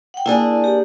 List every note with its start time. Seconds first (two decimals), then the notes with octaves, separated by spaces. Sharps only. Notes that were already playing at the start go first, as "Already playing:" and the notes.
0.14 F#5 G5
0.26 A#3 D4 E4 G#4
0.64 G4